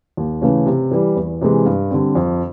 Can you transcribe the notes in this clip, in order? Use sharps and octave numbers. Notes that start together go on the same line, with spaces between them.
D#2
C#3 E3 A3 C#4
C3
E3 G3
E2
C3 E3 G#3
G2
D3 G3 C4
F2